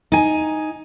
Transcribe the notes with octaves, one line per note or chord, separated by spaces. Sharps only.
D#4 G#5